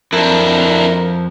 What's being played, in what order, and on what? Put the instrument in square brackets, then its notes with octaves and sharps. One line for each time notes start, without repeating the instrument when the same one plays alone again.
[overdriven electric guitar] F2 [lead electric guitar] D4 E4 [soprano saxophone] A#4